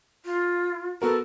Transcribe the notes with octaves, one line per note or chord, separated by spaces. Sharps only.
F4
B3 F#4 A4 A#4